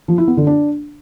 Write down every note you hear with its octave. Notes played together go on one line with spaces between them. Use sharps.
F3
E4
B3
D3
D4